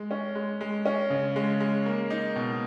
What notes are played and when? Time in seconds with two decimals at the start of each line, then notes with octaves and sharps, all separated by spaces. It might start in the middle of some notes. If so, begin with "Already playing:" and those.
Already playing: G#3
0.11 C#4
0.35 G#3
0.61 G#3
0.85 C#4
1.10 C#3
1.36 G#3
1.60 G#3
1.86 A#3
2.10 D#4
2.36 B2